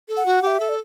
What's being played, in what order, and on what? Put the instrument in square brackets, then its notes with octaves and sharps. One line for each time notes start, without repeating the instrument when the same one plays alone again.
[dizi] A4
[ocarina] F#5
[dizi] F#4
[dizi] G4 [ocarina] F#5
[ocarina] E5
[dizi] A4
[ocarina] D5